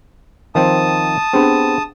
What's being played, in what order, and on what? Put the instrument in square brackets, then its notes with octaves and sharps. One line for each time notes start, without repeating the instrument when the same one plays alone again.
[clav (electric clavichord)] D#3 F3 C4 [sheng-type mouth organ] A5 D#6
[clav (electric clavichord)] B3 C4 [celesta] D4 G4 G#4